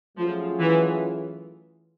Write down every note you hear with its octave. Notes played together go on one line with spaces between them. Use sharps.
F3 F#3 A3 C#4 F4 G#4
E3